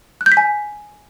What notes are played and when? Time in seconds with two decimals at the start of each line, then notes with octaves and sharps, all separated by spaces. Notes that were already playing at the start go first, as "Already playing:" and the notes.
0.21 F#6
0.26 G6
0.32 B6
0.37 G#5